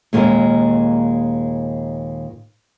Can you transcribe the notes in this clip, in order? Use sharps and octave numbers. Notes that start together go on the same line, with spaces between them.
D#2 A#2 C#3 G#3 A#4